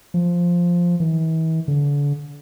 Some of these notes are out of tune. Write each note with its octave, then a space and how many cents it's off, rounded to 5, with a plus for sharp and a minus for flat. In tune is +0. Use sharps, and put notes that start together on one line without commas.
F3 +0
E3 -40
D3 -35